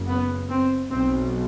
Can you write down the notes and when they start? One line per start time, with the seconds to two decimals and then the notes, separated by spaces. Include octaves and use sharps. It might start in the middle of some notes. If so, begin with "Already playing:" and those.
Already playing: F#1 F#2 C#3
0.08 B3
0.49 C4
0.89 B1 B2 C4